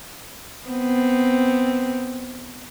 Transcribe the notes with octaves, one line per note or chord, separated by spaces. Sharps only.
B3 C4